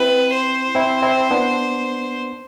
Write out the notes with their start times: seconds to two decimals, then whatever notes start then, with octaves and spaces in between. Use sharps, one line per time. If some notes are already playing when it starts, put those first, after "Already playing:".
Already playing: C4 E4 B4
0.33 C5
0.75 C4 E4
1.02 C4 E4
1.31 B3 D4